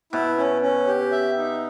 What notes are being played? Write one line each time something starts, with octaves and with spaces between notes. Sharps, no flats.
B2 E4
C#4
C#4
G4
E5
D#4